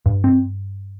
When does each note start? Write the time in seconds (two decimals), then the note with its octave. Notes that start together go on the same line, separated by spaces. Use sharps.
0.06 G2
0.24 C4